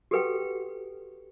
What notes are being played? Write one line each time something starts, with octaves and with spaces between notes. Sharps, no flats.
F#4 G4 A4 B4 F#5 G5